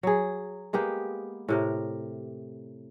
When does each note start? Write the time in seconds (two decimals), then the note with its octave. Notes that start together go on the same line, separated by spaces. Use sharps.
0.03 F#3 G#4
0.73 G#3 A#3 B3 G4
1.48 A2 C3 A#4